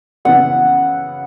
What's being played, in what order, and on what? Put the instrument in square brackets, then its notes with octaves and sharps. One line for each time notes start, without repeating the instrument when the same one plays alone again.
[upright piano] F#2 C#3 E3 B3 E4 [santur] F#5